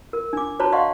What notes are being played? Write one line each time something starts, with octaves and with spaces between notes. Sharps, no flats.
A#4
D4 D6
F#4 C5 C#5 A5 A#5
D5 D#5 F5 F#5 C6 C#6